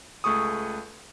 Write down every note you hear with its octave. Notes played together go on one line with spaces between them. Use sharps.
C#2 A3 G#4 C#6 D#6